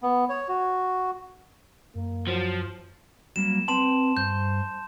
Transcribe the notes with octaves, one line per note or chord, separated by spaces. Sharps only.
B3
C#5
F#4
F#2 A#3
F3 F#3
F#3 G3 A#3 E7
C4 B4 G5 A5 C6 E7
G2 C5 G6